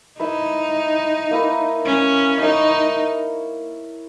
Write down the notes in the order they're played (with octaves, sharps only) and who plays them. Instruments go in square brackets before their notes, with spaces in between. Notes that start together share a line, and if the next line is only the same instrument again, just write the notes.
[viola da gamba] D#4 [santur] E4 B4 E5
[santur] A#3 E4 B4
[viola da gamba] C#4
[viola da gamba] D#4 [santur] E4 A#4 C#5 E5